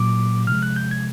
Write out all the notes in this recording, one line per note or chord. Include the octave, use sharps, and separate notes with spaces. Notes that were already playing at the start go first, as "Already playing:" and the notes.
Already playing: A#2 F#3 A#3 D6
C3 F3 G#3 F6
F#6
G6
G#6